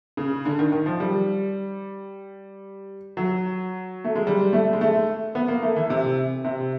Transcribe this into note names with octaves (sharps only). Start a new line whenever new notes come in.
C#3
D3
D#3
D#3
F3
G3
F#3
A3
G#3
G3
A3
G#3
A3
B3
A#3
A3
E3
C3
C3